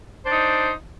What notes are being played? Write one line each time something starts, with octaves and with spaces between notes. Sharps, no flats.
D4 D#4 C5